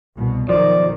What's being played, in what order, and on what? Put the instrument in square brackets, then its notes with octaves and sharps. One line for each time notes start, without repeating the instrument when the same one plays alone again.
[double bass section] C2 B2
[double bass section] B1 D#3 [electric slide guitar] F3 [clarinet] D5